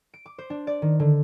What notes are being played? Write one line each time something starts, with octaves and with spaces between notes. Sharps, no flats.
D7
D6
C5
D4
D5
D#3
D3